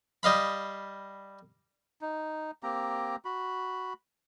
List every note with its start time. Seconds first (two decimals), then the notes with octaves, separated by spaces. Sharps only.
0.23 G3 D#5 F5 B5
2.01 D#4
2.63 A#3 C4 G4 A#5
3.25 F#4 B5